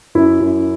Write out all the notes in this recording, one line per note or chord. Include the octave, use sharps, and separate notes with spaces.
F#2 E4
F#2